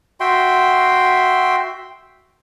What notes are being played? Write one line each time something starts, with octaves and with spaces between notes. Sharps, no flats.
F#4 E5 G5 C6